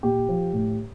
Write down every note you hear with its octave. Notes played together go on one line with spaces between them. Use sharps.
A#2 G4
F3
A2